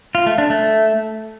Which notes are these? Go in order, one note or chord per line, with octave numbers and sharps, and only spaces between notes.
F4
A3
D4
A3